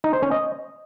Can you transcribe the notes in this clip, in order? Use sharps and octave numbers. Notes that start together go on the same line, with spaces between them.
D#4
C5
C#4
D#5